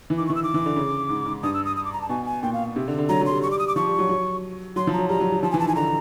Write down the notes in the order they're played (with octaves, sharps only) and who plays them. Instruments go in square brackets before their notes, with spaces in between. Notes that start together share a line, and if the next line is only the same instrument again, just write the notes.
[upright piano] E3
[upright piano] D#3 [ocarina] D6
[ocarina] C#6
[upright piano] E3
[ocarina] E6
[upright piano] D#3 [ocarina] D6
[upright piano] E3
D3
C#3
G#2
G#2
[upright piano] G2 [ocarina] D#6
[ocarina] E6
D#6
D#6
D6
A#5
A5
[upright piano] B2 [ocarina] G#5
[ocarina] G#5
[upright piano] A#2 [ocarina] G5
[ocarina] F5
[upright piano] C3
D3
D3
[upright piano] F#3 [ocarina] A#5
[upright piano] F#3
[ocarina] C6
[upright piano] G3
[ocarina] C#6
[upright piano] G3
[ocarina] D6
D#6
D6
[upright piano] F3 [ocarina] C#6
[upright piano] G3
F#3
F#3
[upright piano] F#3 [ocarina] C6
[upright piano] F3
[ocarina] A#5
[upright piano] F#3
[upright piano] G3 [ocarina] A#5
[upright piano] F#3
F#3
[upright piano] F3 [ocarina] A5
[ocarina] G#5
[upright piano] E3
[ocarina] A5
[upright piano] D#3 [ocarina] G#5
[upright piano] D3 [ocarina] A#5